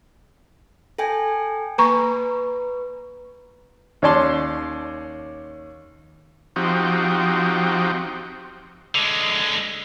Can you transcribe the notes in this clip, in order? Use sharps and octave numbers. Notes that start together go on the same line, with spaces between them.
A4 G5 G#5
A#3 B4 A#5 C#6
D#2 C#4 C#5 D5 A5 C6
F3 C4 D#4 F#4 G4
D3 G#3